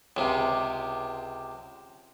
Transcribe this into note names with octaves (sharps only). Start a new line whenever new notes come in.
C#2 C3